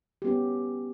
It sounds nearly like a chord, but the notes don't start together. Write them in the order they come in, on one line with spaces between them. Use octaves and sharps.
G4 B3 C#4